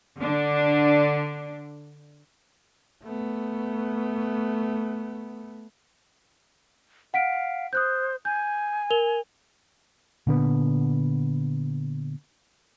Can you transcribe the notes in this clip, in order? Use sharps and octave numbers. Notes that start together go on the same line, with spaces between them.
D3 D4
A3 B3
F5 F#5 B6 D7
C5 D#6 F#6 G6
G#5 G6
A#4 F7 G7
A#2 D3 B3